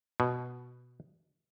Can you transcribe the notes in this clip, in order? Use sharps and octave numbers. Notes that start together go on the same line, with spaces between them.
B2